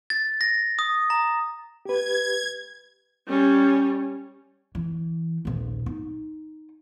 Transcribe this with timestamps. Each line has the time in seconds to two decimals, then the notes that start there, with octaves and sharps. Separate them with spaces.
0.10 A6
0.41 A#6
0.79 D#6
1.10 A#5
1.85 G4 B4 G#6
3.28 G3 C#4
4.75 E3
5.45 D#1 A#1
5.86 D#4